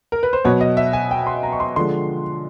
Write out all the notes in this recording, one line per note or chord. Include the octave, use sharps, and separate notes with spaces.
A#4
B4
C5
B2 F#3 B3 C#5
D#5
E5
G#5
G5
C6
A#5
C#6
C6
D3 F3 G#3 C6